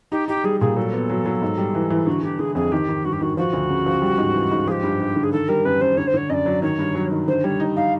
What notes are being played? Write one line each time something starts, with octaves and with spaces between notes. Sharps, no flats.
D#4 G4
D#4 G4
G3 G#4
A#2 G#4
F#3 A4
B3
F#3
F#3
G#2
G3
E3
E3
D3 F#4
D3 G4
D3 G#4
F2 G#4
D#3 G4
D#3
G2 F#4
G4
D#3 F#4
F3 F#4
D2
C#3
F3
G3
G#2
E3
G#2
F3 G4 G#4
G2
G2
D3
G#4
D#3 A4
G3 A#4
F#2 B4
F#2 C5
D3 C#5
C5
D3 C#5
F#2 D5 D#5
F#3
D#3 C#5
G2
F#3
D#3
D3 C5
G3 C#5
D#4
D#4 F5